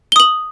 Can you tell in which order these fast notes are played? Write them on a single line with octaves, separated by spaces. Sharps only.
G7 D#6 F#7